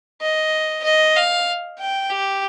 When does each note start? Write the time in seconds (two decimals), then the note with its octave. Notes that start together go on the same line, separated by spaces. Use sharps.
0.21 D#5
0.84 D#5
1.16 F5
1.79 G5
2.10 G4